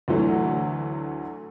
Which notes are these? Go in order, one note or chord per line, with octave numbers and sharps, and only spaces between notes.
D2 D3 E3 F#3 A3